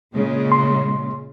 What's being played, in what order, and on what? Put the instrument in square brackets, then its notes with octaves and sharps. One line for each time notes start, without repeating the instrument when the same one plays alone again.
[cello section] A#2 C#3 G#3
[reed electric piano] C6